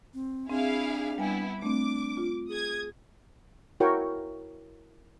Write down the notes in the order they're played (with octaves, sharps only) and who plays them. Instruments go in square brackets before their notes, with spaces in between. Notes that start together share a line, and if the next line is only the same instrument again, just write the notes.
[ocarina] C4
[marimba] C4 [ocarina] D4 [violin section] E4 G#4 F5
[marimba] G3 G#5 [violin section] B3 E4
[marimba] A3 C4 [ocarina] D4 [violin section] D6
[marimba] F4
[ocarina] G#4 [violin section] D#6 G#6
[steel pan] E4 F#4 A#4 C#5 G5 C#6